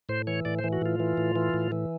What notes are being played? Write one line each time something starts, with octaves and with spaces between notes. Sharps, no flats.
A2 C5
E3 C#5
A2 D5
C5
E3
F#4
A2 F4
E3
A2
E3
A2
E3